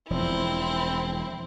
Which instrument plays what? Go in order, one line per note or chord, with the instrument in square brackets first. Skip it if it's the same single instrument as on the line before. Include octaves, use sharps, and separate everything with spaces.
[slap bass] E1 F3 [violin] C4 E4